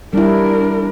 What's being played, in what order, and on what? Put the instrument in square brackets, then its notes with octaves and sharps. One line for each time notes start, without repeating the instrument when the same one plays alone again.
[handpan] G3 E4 [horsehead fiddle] D4 A#4